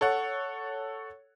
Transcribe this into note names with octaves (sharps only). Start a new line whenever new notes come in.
A4 C#5 F#5